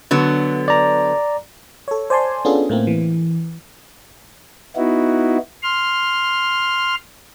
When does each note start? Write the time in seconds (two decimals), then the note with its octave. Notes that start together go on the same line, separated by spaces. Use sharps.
0.11 D3 F#3 B3
0.68 D5 A#5
1.88 A4 C#5
2.10 C5 D5 G#5 A5 C6
2.45 B3 C#4 D4 F4 G#4 A4
2.69 A2 A3 A#3 C4
2.87 E3
4.76 B3 D#4 E4 F#4
5.63 C6 F6